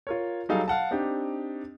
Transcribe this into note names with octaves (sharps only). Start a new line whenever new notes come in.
F4 A#4 C#5
F#3 G3 D#4 G#4 A4 F5
F5 F#5 A5
C4 D4 D#4 G4